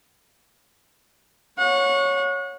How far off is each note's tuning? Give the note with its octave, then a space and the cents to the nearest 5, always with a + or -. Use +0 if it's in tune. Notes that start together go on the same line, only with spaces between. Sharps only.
C#5 +0 F#5 -35